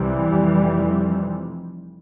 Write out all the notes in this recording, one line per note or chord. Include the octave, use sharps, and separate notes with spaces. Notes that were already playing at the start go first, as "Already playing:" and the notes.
Already playing: C2 C3 E3 G3
F1 F2 C3